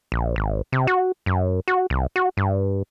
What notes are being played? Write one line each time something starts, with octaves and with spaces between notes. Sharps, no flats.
A#1
G#1
C3
F#4
F#2
F#4
C2
F#4
G2